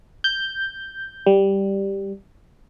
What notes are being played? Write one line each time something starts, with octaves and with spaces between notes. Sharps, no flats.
G6
G3